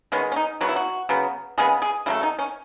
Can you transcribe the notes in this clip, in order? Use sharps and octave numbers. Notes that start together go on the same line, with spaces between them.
D#3 G#3 B3 C#4
C#4
D#4
C#3 F#3 B3 F#4
E4
F#4
C#3 F#3 B3
C#3 G#3 B3 G#4
G#4
C#3 F#3 A3 E4
D#4
C#4